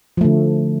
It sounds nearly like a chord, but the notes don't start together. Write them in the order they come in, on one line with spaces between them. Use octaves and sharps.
F3 A3 D3